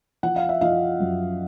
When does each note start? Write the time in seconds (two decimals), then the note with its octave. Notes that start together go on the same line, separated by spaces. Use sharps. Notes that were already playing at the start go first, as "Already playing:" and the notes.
0.23 F3 F#5
0.36 F5
0.49 E5
0.61 F3 D#5 F5
1.00 F#2